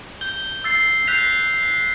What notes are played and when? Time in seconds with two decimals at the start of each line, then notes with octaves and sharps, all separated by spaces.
0.21 G6 G7
0.64 E6 A6 C7
1.07 F#6 G6 B6 C7 F7